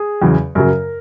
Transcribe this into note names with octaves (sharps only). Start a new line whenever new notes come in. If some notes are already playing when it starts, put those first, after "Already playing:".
Already playing: G#4
E2 C#3 F#3
F#2 C#3 F#3 A#4